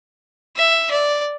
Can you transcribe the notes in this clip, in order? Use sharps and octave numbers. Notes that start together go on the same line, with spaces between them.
E5
D5